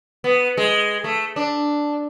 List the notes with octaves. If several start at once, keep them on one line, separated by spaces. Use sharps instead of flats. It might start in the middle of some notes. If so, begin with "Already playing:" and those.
B3
G#3
A3
D4